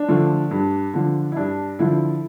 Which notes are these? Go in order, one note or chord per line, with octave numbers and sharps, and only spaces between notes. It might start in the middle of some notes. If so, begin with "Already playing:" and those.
Already playing: D4
D3 F3 A3
G2
D3 F3
E4
G2 D4
D3 F3 E4